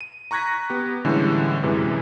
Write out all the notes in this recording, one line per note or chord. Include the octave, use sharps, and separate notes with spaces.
D#7
A#5 C#6 F#6 G#6 A#6 B6
B3 G4
A2 D3 E3 G3 G#3 C#4
F#2 C3 E3 G#3